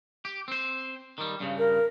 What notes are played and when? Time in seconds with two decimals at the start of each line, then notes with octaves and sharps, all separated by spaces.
0.25 G4
0.48 C4 C5
1.18 D#3 G3
1.40 G2 C#3
1.58 A#4